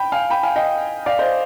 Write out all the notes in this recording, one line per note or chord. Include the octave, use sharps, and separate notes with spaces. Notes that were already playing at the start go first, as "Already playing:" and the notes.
Already playing: G5 B5
F5 G#5
G5 B5
F5 G#5
D#5 G5
D5 F5
C5 D#5